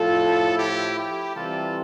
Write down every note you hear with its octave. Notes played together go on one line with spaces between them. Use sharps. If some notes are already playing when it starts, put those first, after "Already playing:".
Already playing: A2 F3 F4 A4
E4 G4
E4 G4
C3 E3 G3 F4 A4